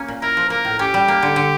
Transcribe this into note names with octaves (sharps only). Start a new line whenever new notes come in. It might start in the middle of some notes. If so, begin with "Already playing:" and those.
Already playing: A#3 C#4
A#2
E4 A#4
F3
A#3 A#4
A2
C#4 G4
G3
A#3
D3
D3